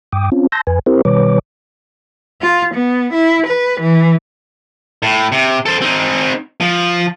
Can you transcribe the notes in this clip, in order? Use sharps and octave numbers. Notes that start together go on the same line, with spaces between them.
G2 G5 D6 D#6
C4 C#4 F4
A5 C6 E6 G6 A#6
F2 B4 G#5
C4 E4 G4 A#4 C5
B2 D#3 G3 B4 C#5 D6
F4
B3
E4
B4
E3
A2
C3
A4 C5
C4 D#4
F3